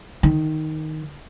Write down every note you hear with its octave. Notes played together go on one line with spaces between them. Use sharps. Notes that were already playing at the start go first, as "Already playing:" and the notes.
D#3